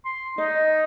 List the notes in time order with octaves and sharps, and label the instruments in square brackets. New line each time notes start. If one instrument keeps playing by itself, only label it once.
[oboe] C6
[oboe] D#4 [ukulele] D#5